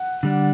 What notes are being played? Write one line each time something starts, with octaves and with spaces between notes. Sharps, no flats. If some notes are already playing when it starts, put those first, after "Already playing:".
Already playing: F#5
D3 G3 D4